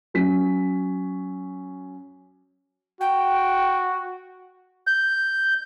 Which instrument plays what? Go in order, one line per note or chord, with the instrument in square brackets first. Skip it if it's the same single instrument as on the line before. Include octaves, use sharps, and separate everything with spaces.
[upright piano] F#3 C#4 B6
[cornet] F#4 [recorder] G5
[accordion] G6